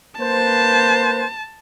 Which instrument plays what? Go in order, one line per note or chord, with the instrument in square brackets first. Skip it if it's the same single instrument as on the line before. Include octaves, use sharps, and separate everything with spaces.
[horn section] A#3 B4 C5 [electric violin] A5